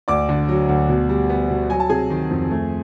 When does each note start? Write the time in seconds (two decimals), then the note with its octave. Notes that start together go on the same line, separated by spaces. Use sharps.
0.08 D2 D5 D6
0.29 D3
0.49 F#3
0.69 D2
0.89 B2
1.09 G3
1.30 B3
1.50 B2
1.70 F#3 G#5
1.80 A5
1.89 C3 G#4 G#5
2.10 D#3
2.30 F2
2.51 A3